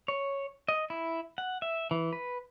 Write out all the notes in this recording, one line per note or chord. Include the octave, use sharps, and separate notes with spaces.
C#5
D#5
E4
F#5
E5
E3
B4